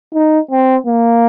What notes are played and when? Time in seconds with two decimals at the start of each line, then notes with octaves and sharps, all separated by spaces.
0.14 D#4
0.51 C4
0.86 A#3